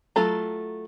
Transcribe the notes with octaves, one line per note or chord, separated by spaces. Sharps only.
F#3 A3 F4 A4 A#5